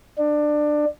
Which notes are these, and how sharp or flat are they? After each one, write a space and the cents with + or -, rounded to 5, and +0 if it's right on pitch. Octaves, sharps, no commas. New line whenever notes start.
D4 +20